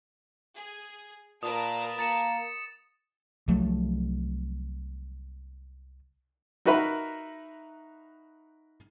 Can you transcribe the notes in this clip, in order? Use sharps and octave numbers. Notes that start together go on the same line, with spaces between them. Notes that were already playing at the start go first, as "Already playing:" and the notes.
G#4
A#2 A#4 B4 A5 D#6
A#3 A6 C#7 E7
C2 F3 F#3 A3
D#4 F#4 A#4 B4 E5 B5